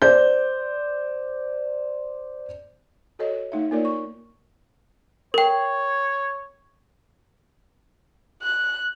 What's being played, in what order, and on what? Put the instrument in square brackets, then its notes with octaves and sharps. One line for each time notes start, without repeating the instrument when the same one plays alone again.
[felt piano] C5 D5 G6
[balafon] F#4 A4 C#5 D#5
A3 D#4 E5
A#3 D#4 F4 A#4 C#5 D5
C#6
[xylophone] A#4 G5 [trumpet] C#5
[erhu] F#6